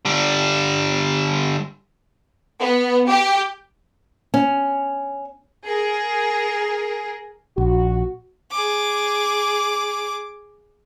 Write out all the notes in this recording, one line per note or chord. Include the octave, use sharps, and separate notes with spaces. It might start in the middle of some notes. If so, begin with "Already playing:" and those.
D3 G3
B3
G4
C#4
G#4 A#4
A#1 F#4
G#4 D6